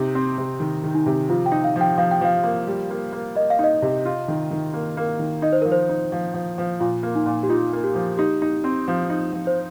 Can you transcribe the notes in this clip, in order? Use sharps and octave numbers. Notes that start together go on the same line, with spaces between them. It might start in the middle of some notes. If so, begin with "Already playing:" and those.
Already playing: C3 D#4
C4
C3
D#3
D#3
D#4
C3
F3 F4
G5
D#4
F5
F3
G5
F3 F5
G5
F3 F5
A#3
G3
A#3
A#3
A#3 D#5
F5
D#4 D#5
C3
F4
D#3
D#3
A#3
A#3
D#3
D#4 D#5
C5
F3 A#4
C5
D#4
F3
F3
F3
A#2 F4
A#3
D#4
A#2
G4
D#4 F4
A#3
G4
F3
D#4 G4
D#4
C4
F3
D#4
F3
C5